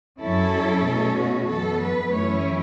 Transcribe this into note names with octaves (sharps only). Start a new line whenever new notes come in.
F#2 F#3 C#4 E4 A4
B2 A3 C#4
F#4
F#2 E3 B3 A4
B4
F#2 E3 A3 C#4 E4 C#5